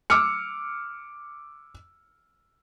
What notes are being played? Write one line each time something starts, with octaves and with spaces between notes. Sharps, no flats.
D6 E6 F6 C#7